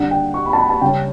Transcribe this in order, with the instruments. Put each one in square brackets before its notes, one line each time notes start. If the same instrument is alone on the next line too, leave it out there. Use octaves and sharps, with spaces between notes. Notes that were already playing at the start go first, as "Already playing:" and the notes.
Already playing: [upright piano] D3 G3 D4 F#5
G5
C#6
B5
A5
B5
A5
C#3 G3 C#4 G5